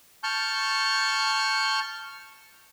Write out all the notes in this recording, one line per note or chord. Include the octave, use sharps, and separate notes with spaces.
A5 C#6 F6 G6